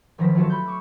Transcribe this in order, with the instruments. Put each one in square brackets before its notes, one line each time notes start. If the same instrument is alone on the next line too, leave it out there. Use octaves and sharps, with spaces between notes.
[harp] G1 D#3 F3 F#3 A#6 B6
F#3 A3 F4 F#4 A4
B5 F#6 G6
C#6 D6 E6